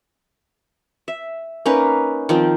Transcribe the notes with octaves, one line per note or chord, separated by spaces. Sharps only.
E5
A#3 C#4 D#4 B4
D#3 F3 C4